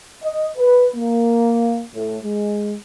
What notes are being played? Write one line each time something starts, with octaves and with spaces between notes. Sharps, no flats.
D#5
B4
A#3
A2
G#3